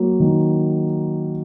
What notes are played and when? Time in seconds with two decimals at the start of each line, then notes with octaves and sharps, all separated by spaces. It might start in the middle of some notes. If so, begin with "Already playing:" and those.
Already playing: F#3 A#3
0.20 D#3